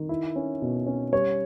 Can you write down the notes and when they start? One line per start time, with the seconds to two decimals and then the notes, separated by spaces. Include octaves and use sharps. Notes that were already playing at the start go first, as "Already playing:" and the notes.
Already playing: D#3
0.09 E4
0.36 C#4
0.62 B2
0.86 C#4
1.12 G3 C#5